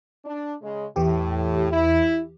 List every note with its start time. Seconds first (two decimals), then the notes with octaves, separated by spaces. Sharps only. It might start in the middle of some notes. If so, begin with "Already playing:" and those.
0.24 D4
0.62 C#3 G#3
0.96 E2 A2 E3 G4
1.71 E4